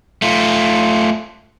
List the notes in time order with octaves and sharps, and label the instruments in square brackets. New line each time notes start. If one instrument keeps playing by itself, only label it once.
[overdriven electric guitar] A3 F4